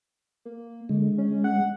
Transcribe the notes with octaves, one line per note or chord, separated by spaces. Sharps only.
A#3
D3 G#3
C#4
F#5